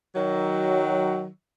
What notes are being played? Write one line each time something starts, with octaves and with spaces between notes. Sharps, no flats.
D#3 F#3